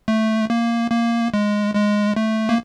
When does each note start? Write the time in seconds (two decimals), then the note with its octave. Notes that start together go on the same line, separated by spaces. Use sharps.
0.08 A3
0.50 A#3
0.91 A#3
1.34 G#3
1.75 G#3
2.16 A3
2.49 A#3